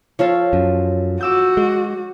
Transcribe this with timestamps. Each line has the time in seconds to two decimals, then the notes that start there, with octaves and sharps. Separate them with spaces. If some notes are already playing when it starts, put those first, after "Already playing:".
0.19 F3 F4 A4 C#5 F5
0.53 F#2
1.21 F#4 D6 E6 G6
1.57 G#3